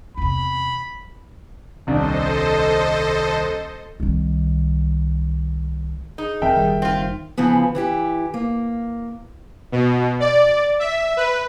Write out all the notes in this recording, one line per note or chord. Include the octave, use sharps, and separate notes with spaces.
E2 C3 B5
D#1 C2 D4 A4 C5 D#5
C2 D#3
D#4 G#4
E1 E3 C4 A#4 E5 G5
F#1 D#3 G3
C4 D#4 F4
C#3 E3 F3 B3
E3 E4 G4
A#3
B2
D5
E5
B4